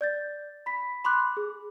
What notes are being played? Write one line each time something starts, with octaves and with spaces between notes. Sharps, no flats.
D5 G6 A6
B5 B6
B5 C6 D6 F#6
G#4